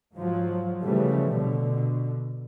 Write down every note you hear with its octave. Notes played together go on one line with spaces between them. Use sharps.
G#2 F3 F#3
C#3 E3 F3 G3 A3
B2 D3